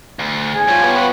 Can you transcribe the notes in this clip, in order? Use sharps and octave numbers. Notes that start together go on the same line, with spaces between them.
D2
E2 G#2 G#4 G#5
F3 G3 F4 C#5 G5
F3 B3 F#4 G4
B4